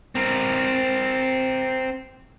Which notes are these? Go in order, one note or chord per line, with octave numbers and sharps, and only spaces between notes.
C4 A#4